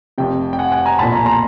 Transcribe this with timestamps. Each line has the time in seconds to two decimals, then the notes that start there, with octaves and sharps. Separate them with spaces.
0.18 F1 F2 C3 G5
0.53 G5
0.59 F#5 G#5
0.72 F#5 G#5
0.86 G#5 A#5
0.99 B1 A#2 A5 B5
1.12 G#5 A#5
1.26 A#5 C6